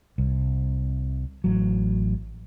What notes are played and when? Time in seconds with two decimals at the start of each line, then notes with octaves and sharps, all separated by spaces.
0.18 C2
1.44 A1 F#3